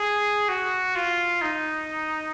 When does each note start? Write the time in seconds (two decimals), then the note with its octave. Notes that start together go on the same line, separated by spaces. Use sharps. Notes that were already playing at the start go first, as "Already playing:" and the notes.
Already playing: G#4
0.49 F#4
0.96 F4
1.42 D#4